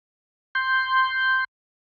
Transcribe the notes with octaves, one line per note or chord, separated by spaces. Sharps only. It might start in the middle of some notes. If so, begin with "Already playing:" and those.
C6 G6